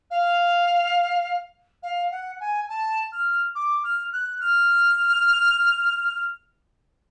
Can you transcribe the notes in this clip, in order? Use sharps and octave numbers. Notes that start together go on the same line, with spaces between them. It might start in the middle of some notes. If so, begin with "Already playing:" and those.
F5
F5
F#5
G#5
A5
F6
D6
F6
F#6
F6